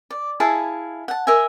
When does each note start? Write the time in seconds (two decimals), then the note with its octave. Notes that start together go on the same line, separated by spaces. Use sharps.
0.10 D5
0.40 E4 G#4 F5 A5
1.08 F#5 A5
1.27 A#4 D#5 E5 G#5